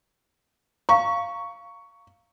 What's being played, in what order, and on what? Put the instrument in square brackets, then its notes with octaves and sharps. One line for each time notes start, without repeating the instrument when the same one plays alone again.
[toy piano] F5 A#5 [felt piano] C#6